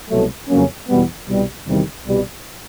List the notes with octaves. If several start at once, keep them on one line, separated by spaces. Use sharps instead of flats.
C2 B2 F#3 A3
F2 C#3 F#3 A#3 C#4
E2 B2 G3 B3
C2 B2 G3
E2 C3 D#3 G3
C2 B2 G3